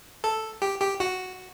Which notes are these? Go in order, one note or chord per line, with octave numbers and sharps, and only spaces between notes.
A4
G4
G4
F#4